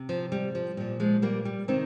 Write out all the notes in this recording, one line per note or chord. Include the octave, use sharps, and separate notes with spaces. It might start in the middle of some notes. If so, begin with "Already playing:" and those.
Already playing: C3
F3
G3
F3
A#2 F3 G3
F3 G#3
G3 A#3
G3
C3 D#3 C4 D#4